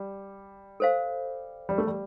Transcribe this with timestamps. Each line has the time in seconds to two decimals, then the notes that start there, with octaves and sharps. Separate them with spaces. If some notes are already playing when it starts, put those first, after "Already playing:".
Already playing: G3
0.80 A4 C5 F5
1.69 G3
1.78 A3
1.87 G3